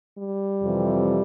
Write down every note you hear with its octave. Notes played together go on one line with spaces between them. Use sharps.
G3
F2 C3 E3